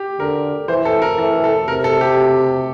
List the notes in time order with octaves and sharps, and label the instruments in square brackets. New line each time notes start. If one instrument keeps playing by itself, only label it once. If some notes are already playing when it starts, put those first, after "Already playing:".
Already playing: [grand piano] G4
[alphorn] D3 [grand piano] A#4
[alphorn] E3 [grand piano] C5
[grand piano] A4
A#4
[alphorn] E3 [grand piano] A4
[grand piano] A4
[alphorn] C3 [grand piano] A#4
[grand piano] A4
G4